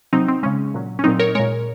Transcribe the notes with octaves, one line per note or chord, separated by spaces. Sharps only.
C3 F#3 C4 D#4
C4
C#3 G#3 C#4
A#2 F#3
C#4
A#2 F#3 C4 D#4
A#4 C#5
A#2 G#3 A#4 C#5